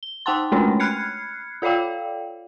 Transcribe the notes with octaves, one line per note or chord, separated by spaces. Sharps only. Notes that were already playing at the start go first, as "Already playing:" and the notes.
G7
D#4 F#5 G5 A5 C6
G#3 A3 C#4 D4 C#5
B5 F6 F#6 G#6 C7 C#7
F4 A4 C#5 D5 F5 G5